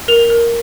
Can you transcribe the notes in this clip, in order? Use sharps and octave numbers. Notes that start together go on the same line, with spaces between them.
A#4 F7
A#4